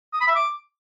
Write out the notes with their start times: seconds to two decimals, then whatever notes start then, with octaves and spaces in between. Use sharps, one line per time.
0.13 D#6
0.20 B5
0.28 E5
0.35 D6